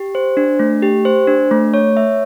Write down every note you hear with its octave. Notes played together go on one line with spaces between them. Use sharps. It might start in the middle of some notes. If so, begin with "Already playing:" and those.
Already playing: G4
C5
D4
A3
G4
C5
D4
A3
C#5
E5